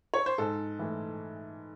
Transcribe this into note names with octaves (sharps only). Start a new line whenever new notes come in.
C#5
C5
G#2 A4
E3 A3